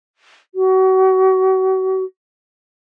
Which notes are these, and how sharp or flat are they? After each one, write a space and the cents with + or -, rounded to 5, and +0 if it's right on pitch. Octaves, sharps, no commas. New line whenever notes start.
F#4 +35